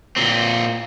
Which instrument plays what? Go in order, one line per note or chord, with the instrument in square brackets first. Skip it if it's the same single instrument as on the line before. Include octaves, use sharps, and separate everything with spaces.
[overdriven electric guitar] A#2 C4